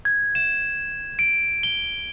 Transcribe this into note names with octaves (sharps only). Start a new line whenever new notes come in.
G#6
E7
D7
G7